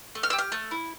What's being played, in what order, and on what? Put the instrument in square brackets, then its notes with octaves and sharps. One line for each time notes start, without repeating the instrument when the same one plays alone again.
[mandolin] A3
F6
G4 E6
F6
A3
E4